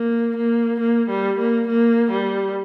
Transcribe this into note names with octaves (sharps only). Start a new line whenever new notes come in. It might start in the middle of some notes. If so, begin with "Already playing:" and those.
Already playing: A#3
A#3
A#3
G3
A#3
A#3
G3